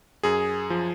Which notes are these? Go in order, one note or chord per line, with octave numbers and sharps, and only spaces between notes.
F#2 G#4
F3